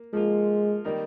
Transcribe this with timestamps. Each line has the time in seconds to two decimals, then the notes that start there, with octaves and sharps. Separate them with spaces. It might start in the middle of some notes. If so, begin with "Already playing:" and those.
Already playing: A#3
0.13 F3 G#3 A#3 F4
0.85 D#3 G3 A#3 D#4 A#4